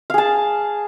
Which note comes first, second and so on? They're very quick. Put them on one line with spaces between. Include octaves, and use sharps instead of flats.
F5 G#4 A5